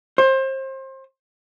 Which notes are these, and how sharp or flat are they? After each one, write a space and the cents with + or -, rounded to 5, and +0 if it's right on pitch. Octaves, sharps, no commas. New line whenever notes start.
C5 +30